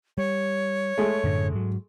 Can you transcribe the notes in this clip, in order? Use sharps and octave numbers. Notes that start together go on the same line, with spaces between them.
G3 C#5
G#3 A3
F#2 A2 D3
G#2 F#3